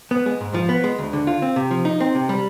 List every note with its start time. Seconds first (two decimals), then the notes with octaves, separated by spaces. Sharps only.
0.11 B3
0.26 G#3
0.41 G#2
0.54 F3
0.69 B3
0.84 G#3
0.99 D2
1.13 D3
1.27 F4
1.42 C4
1.56 C3
1.71 F3
1.85 D#4
2.00 C4
2.15 C3
2.29 G3